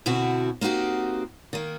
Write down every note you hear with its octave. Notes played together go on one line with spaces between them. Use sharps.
B2 D3 C4 E4 F#4
A#3 C4 D#4 F#4 G4
D#3 A#3